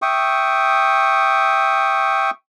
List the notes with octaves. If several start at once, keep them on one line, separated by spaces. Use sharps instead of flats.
E5 G5 C#6 D#6